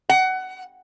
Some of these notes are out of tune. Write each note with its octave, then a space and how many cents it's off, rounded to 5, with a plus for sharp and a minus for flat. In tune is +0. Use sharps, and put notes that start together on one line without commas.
F#5 +20